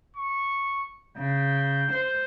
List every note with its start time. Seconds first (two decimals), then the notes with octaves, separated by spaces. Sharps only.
0.17 C#6
1.17 C#3 G6
1.91 C5